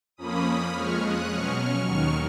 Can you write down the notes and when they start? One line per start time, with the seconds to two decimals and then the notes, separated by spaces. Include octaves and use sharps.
0.17 F2 F3 A#3 C#4 B5 D#6
0.73 F2 F3 G#3 C#6 F6
1.02 D#6 F#6
1.29 B2 F#3 C#4 C#6 F6
1.57 C#6 F6
1.85 D#2 D#3 F#3 C#6 F6